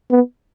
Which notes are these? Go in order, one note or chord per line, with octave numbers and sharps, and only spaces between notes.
B3